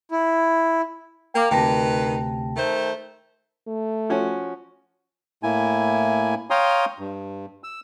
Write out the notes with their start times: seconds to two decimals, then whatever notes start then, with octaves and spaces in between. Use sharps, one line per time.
0.11 E4
1.34 A#3 G5 D6
1.51 D2 C3 D#3 B4 G5 A5 A#6
2.57 D#3 A3 C5
3.67 A3
4.10 F3 C#4 F#4
5.43 A2 A#3 E4 G#5
6.50 C#5 F5 G5 A#5 C6 D#6
6.99 G2
7.64 E6